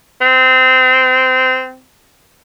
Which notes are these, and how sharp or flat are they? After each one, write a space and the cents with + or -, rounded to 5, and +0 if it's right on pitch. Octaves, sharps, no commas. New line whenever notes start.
C4 -20